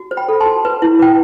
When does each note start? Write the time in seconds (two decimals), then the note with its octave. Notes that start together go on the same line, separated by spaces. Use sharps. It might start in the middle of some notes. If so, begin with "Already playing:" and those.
Already playing: F#4
0.11 C5
0.17 G5 B5
0.28 A4
0.40 A5 C6
0.46 F#4
0.65 B4
0.82 E4
0.99 B4 G5